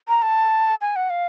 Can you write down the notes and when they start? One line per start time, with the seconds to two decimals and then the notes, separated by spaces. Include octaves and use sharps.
0.08 A#5
0.22 A5
0.81 G#5
0.96 F#5
1.10 F5